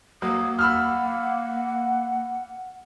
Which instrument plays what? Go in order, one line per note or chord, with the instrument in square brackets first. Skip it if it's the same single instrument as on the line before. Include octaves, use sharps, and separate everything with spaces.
[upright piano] F#3 [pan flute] A#3 [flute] D#6
[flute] F#5 [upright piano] B5 E6 F6